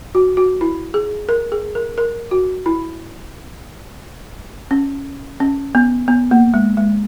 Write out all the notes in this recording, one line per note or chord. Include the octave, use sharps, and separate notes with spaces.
F#4
F#4
E4
G#4
A#4
G#4
A#4
A#4
F#4
E4
C#4
C#4
B3
B3
A#3
G#3
G#3